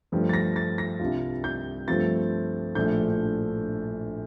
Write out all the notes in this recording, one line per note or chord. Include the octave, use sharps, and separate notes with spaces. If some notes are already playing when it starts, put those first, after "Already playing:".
G2 F3 A3 D4
A6
A#6
A6
A#6
C2 C3 G3 D4 F4
G6
G2 F3 A3 C4 F4 A6
A#1 A2 F3 A3 D4 G6